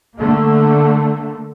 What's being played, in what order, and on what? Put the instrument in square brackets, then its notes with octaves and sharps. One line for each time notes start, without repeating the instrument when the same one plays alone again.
[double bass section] D3 A3 A#3